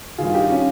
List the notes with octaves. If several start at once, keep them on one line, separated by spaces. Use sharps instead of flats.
G2 D#3 F4 G#4
F4
D#4 G4
C#4 F4